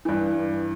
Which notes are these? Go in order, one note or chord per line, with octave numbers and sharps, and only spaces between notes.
G2 E3